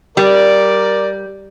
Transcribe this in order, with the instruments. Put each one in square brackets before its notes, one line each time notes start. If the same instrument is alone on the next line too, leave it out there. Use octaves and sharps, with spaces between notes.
[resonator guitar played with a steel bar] G3 [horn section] A#4 D5